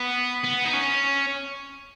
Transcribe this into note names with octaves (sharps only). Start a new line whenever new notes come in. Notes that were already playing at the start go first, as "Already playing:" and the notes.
Already playing: B3
B3
D#4
C#4